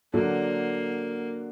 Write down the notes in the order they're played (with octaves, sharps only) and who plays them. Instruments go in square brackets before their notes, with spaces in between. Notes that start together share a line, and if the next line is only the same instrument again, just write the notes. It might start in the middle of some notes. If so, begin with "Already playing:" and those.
[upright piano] D3 F#3 D4 [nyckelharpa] A#3